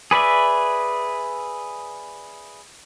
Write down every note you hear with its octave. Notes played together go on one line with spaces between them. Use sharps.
G#4 B4 D5 E5